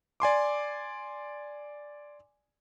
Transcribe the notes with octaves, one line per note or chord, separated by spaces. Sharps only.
D5 G#5 C6 D6